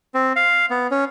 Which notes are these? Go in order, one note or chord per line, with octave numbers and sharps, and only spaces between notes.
C4
F5
B3
C#4